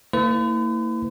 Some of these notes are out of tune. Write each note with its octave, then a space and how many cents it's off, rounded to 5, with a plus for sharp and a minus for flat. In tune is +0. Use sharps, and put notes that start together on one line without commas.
A#3 -35 E4 -25 B4 +45